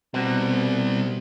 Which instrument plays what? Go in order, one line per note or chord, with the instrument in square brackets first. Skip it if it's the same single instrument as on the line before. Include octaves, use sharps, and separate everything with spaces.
[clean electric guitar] B2 [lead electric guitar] G3 C4